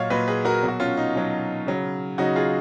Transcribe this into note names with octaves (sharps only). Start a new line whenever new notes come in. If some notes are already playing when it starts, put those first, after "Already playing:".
Already playing: A#2 F#3 C#5 D#5 F5 F#5
A#2 F#3 B4 D#5
G#4 B4
F#4 A#4
B2 F#3
F#4
C#4 F4
D#4
B2 F#3
C#3 F#3
C#3 F#3 D#4 F#4
F4 G#4